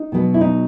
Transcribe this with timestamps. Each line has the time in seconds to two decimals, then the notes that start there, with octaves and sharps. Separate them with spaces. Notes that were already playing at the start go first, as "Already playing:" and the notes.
Already playing: D#4
0.12 B2 F#3 B3
0.34 E4
0.41 D#4